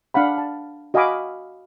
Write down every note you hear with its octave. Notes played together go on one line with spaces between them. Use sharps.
D4 F5 F#5 B5
A5
F#4 D#5 F5 G#5 B5 D6